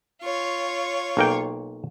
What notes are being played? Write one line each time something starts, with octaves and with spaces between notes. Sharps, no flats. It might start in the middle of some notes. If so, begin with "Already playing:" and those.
F4 C#5
B1 A#3 G5